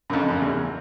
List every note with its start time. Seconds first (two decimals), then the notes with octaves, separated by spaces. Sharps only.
0.10 F#2
0.13 F2
0.28 F#2
0.42 E2